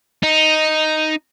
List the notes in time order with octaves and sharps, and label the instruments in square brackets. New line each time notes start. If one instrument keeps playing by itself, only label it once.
[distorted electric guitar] D#4